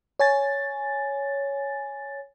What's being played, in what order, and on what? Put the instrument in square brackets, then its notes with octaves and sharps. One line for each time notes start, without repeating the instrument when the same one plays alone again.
[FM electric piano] C#5 G#5 A6